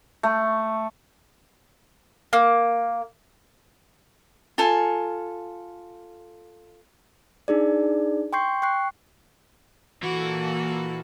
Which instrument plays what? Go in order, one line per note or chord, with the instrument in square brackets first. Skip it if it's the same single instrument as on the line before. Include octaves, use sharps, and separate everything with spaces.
[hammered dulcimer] A3
[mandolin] A#3
[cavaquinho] F4 A4 G#5
[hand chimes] D4 D#4 G#4 D5
G5 C6 C#6 G6 C7
G5 C#6 F#6 C7
[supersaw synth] A#2 A#3 A4 [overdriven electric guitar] E3 [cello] F#4